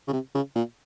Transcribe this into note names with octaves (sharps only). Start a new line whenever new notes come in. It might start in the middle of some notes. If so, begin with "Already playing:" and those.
C#3
C3
C#3
A#2